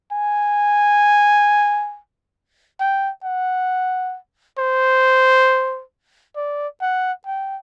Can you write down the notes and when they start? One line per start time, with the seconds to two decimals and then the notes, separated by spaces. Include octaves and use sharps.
0.12 G#5
2.80 G5
3.24 F#5
4.58 C5
6.36 D5
6.82 F#5
7.26 G5